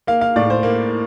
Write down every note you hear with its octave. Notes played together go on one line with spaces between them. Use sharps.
A#3 F5
F5
A2 D5
C5
A#3